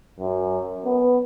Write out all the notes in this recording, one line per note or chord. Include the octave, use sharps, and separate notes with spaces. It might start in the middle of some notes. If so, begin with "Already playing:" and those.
F#2
B3